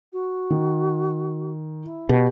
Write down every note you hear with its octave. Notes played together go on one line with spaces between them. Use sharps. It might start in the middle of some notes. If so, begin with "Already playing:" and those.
F#4
D#3
E4
B2 G4